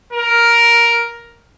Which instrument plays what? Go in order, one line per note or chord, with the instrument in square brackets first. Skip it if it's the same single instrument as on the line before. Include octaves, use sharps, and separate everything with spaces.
[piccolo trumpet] A#4